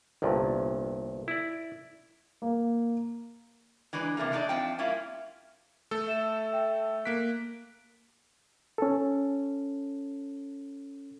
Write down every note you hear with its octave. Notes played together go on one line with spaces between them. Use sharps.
G1 C2 G2 A#2
E4 D5
A#3
E3 G#3 D4 B4
C3 E3 A3 A#3
A3 D4 D#4 D5
F2 F3 C4 G5 A5
G3 A#3 C#4 E4 F4
A3 A4
E5 E7
E5 G5
A#3 F#6 B6 D7
C#4 A4